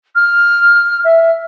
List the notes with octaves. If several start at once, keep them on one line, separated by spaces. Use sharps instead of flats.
F6
E5